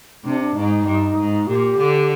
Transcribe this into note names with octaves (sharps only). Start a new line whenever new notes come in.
C3 D4
D4
G#2 D#4
G2
G#2
A#2 G4
D3